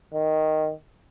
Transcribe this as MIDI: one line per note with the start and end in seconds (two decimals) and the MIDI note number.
0.14 0.71 51